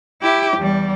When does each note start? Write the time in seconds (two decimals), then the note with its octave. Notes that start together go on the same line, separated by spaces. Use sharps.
0.22 E4 G4
0.58 E2 G3